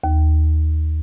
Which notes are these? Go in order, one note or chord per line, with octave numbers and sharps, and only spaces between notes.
D#2